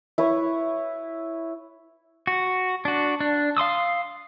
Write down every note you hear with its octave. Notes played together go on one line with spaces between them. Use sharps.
E4 B4 C#5
F#4
D4 F#4
D4
F5 C6 D#6 E6